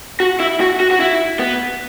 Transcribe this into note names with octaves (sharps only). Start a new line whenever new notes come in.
F#4
E4
F#4
F#4
F#4
E4
B3